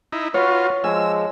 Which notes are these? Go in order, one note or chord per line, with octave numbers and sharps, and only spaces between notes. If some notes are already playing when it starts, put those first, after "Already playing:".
D#4 E4
F4 F#4 B4 C#5
F3 G#3 G#5 E6